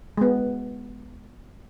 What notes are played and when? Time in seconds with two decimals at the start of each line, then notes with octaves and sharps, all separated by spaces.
0.17 G#3 B3